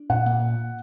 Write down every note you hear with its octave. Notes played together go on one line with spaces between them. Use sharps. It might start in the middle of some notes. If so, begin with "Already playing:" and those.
Already playing: D4
A#2 F#5
A#2